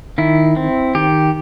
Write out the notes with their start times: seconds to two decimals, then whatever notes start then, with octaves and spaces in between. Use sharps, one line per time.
0.18 D#3 E4
0.56 C4
0.95 D#3 G4